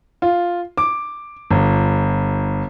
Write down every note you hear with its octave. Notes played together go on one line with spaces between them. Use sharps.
F4
D6
G1